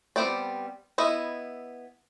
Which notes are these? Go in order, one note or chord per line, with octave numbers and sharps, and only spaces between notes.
G3 B3 C4 D#4 D5
B3 E4 D#5